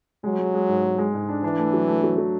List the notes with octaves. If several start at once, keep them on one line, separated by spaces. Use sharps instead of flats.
F#3 G#3
G#3
G#3
G#2
G#3
G#3
G#2
D4
E3 D4
A3
F#3
A3
F#3
F#3